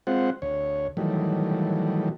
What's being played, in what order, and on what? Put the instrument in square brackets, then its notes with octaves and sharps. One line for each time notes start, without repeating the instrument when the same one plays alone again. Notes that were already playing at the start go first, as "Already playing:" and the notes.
[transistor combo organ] G#3 C4 F4 C5 F#5
D2 C#5
D#3 E3 F#3 G3 A3